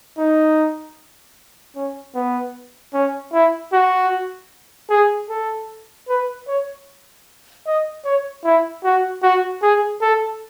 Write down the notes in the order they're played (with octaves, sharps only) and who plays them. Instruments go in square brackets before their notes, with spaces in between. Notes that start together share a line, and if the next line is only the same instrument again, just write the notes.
[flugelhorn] D#4
C#4
B3
C#4
E4
F#4
G#4
A4
B4
C#5
D#5
C#5
E4
F#4
F#4
G#4
A4